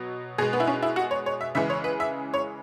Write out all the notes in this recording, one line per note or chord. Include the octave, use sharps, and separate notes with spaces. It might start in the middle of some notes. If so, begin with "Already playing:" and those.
Already playing: B2 F#3
B2 G#3 G#4
B3
E4
C#4
E4
F#4
C#5
C#5
E5
C#3 E3 G#3 E5
C#5
B4
E5
C#5